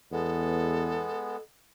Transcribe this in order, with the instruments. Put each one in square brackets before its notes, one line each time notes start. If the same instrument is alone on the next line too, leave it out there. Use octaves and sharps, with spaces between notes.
[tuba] E2 [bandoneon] G#3 B3 [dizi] A4